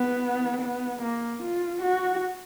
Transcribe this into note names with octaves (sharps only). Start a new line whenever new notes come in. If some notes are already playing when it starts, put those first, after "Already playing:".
Already playing: B3
B3
A#3
F4
F#4